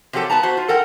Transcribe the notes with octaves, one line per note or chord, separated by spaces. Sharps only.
C3 F3 F#3 G4 A4
B3 B4 A5 A#5
F#4 C5 E5
F4
A4 A#4 F#5 G5